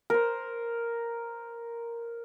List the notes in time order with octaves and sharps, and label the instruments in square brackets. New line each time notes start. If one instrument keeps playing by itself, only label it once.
[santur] A#4 C5